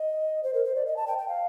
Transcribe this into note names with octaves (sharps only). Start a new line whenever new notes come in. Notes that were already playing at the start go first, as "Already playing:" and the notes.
Already playing: D#5
C5
A#4
C5
D5
D#5
A5
G5
G5
F5